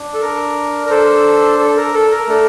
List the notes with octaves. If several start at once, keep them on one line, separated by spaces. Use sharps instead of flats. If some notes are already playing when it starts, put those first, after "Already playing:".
Already playing: D4
A4
A#4
A#4
A4 C5
A4
A#4
A4
A#4
A3 D4 A4